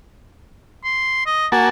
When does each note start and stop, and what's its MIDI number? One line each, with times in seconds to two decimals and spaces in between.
0.84 1.23 84
1.26 1.47 75
1.52 1.69 58
1.52 1.69 66
1.52 1.69 80
1.52 1.69 81